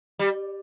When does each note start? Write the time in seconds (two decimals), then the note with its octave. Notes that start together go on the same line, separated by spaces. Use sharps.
0.19 G3